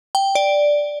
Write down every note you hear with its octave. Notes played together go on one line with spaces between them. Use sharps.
G5
D5